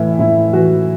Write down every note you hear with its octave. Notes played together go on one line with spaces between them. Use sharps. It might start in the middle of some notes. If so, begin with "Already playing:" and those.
Already playing: A2 E3 E4
A2 E4
E3 F#4